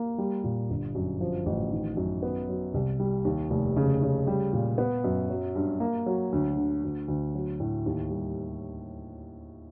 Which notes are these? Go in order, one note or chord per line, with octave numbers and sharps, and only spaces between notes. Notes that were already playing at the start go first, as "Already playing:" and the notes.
Already playing: A#3
G3
A#2
G1
F#2
F3
A1
D#3
F#2
B3
F#3
C2
G3
D#2
F1
C#3
C#3
G3
A#2
B3
F#2
F#3
G2
A#3
F#3
D2
D3
D2
D2
F#3
A2
D#2
G3